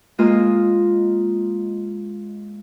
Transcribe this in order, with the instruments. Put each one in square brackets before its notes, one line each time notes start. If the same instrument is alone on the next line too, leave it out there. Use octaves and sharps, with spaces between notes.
[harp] G#3 A#3 F4 A#4 D#5